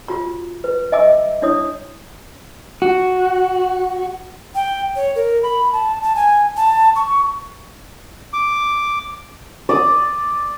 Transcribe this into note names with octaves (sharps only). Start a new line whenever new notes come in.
F4 F#4 A#5
B4
D#5 E5 G#5 A#5 D6 E6
D4 E4 C#5 D#6
F#4
G5
C#5
A#4
B5
A5
A5
G#5
A5
C#6
D6
D5 D6 D#6